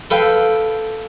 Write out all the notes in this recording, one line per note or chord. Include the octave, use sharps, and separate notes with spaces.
A4 B4 F5 G5